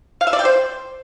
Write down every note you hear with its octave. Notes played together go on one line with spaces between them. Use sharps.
F5
E5
D5
G5
C5